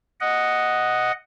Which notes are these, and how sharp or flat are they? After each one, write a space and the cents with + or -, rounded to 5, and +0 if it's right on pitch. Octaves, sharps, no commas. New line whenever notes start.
D#5 +0 F#5 +0